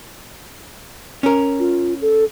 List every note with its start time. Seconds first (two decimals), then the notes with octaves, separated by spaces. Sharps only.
1.23 C#4 A#4
1.59 F4
2.01 A4